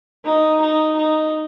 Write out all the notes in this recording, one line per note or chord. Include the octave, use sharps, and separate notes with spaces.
D#4
D#4
D#4